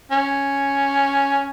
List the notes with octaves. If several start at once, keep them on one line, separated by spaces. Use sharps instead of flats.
C#4